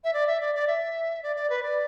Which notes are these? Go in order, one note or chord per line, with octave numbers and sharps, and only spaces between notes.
E5
D5
E5
D5
D5
E5
D5
D5
B4
D5